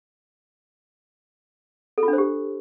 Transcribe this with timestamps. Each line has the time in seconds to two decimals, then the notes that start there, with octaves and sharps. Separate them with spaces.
1.98 A4
2.03 F4
2.08 D4
2.13 C5
2.18 G4